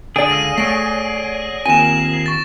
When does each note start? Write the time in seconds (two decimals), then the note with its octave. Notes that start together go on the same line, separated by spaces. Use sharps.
0.16 D3 G#4 D5 F#5 A5 D7
0.30 C#2 F5 E6 A#6 D#7
0.58 A3 C#5 D5 F#5 A#6 D7
1.66 D#2 C4 F4 A#4 G#5 A#6 E7
2.26 C#6 A6